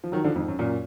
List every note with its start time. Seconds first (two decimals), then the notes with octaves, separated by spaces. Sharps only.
0.04 F3
0.12 D#3 F#3
0.24 D3 F3
0.35 F2 G#2
0.48 F#2
0.59 F#2 A#2